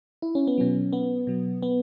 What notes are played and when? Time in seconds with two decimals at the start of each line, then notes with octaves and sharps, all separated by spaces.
0.22 E4
0.35 C#4
0.47 B3
0.58 B2 F#3 C#4
0.93 B3
1.27 B2 F#3
1.63 B3